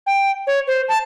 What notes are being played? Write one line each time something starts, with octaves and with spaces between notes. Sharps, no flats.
G5
C#5
C5
A5